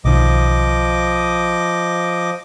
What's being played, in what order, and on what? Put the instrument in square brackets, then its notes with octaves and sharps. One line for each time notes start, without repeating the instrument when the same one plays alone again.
[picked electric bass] B1 D#3 [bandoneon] F3 D#5 D6